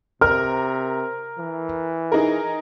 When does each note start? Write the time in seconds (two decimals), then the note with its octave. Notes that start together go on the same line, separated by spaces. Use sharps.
0.21 C3 A#4 F6
1.39 E3
2.12 D#4 G#4 A#4